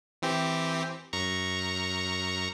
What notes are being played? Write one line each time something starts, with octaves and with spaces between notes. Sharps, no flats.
E3 C4 G4
F#2 A#5 C#6